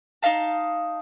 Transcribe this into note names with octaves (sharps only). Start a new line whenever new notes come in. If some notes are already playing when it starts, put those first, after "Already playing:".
D#4 D5 F5 A5